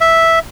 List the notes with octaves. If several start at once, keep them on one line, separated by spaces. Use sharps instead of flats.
E5